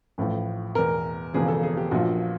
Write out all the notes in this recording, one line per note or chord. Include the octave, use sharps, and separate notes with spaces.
A1 A2 F3
E2 B2 A#4
E1 E2 C#3 F3 G#4
A4
G#4
G4
A#1 A#2 F3 F#4